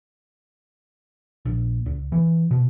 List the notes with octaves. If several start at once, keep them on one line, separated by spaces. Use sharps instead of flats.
A#1
C#2
E3
B2